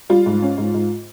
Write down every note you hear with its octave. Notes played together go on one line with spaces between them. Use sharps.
G3 F4
G#2
C#4
G#2
G#2